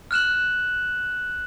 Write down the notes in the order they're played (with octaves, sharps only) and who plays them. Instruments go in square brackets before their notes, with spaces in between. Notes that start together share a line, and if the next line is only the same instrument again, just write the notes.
[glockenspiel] F6 F#6 E7 F#7